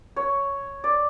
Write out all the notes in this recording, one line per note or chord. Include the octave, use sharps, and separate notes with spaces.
C#5
D5